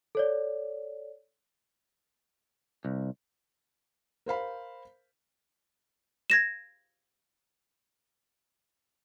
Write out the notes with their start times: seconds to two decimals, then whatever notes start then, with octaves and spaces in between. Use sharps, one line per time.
0.15 A4 C#5 D5
2.85 C2
4.26 A#4 C5 F5 B5
6.30 G#6 A#6 E7